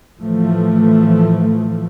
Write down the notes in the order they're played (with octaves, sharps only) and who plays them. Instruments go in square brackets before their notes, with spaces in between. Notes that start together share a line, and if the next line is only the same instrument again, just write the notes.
[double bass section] A2 E3 F3 A3